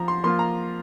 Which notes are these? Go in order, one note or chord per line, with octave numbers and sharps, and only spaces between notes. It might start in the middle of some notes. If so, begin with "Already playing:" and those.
Already playing: F3 A#5
C6
F3 A#3 F4 C6
A#5